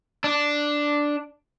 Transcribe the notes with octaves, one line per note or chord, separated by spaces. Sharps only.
D4